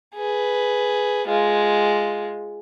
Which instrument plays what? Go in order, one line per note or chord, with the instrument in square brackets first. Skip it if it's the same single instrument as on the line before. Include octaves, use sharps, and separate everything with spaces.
[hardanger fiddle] G#4 B4
G#3 F4